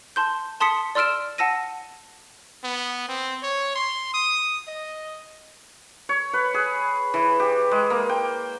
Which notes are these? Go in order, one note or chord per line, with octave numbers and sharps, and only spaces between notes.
A5 C6 G6
A5 C6 D#6 B6 C#7
D5 C6 E6 F6 D7 E7
F#5 A5 E6 A#6 D#7
B3
C4
C#5
C6
D#6
D#5
C#5
B4
G#4
E3
G4
G#3
A#3
G5